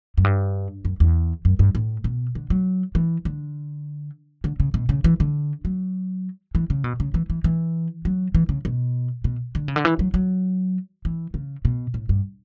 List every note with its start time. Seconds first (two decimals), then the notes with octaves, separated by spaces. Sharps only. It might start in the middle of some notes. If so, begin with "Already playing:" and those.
0.18 F#2
0.24 G2
0.85 F#2
1.00 E2
1.45 F#2
1.59 G2
1.75 A2
2.04 B2
2.35 D3
2.50 F#3
2.95 E3
3.25 D3
4.44 D3
4.60 C#3
4.74 B2
4.89 C#3
5.04 E3
5.20 D3
5.65 F#3
6.55 E3
6.70 C#3
6.84 B2
7.00 C#3
7.14 E3
7.30 E3
7.44 E3
8.05 F#3
8.35 E3
8.49 C#3
8.65 B2
9.24 B2
9.55 D3
9.68 C#3
9.76 D3
9.85 E3
9.99 F#3
10.14 F#3
11.05 E3
11.34 C#3
11.65 B2
11.94 A2
12.09 G2